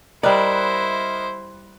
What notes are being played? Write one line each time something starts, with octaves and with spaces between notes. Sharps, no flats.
G3 E4 A#4 C5 D5 D#5 F#6